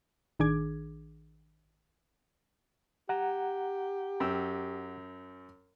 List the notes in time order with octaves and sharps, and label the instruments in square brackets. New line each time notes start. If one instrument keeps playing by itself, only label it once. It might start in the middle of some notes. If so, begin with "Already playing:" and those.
[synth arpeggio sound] A1 D#3 D4 G#4 D6 G#6
[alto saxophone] G4 [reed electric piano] F#5 A#5
[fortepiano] F#2 G5 E6